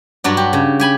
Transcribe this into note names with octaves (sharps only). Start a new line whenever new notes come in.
G2 F#3 D4
G4
C#3
G4 G#5 B5